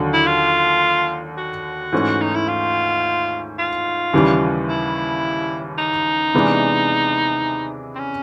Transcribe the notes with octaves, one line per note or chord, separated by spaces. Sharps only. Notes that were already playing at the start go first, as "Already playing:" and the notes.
Already playing: D#2 D3 F#3
E4
F4
F#4
G#2 E3 A3 C#4
D#4
E4
F4
F4
D#2 C#3 E3 G3
E4
D#4
C3 E3 G#3 B3 D4
C4
C#4